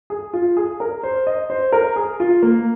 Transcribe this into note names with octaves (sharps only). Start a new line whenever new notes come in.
G#4
F4
G#4
A#4
C5
D#5
C5
A#4
G#4
F4
A#3